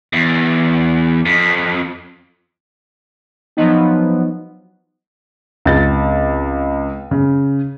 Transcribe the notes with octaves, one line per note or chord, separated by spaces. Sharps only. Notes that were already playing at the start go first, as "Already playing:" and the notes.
E2
F2
F3 F#3 B3 D#4 D#5
C#2 C3 A6
C#3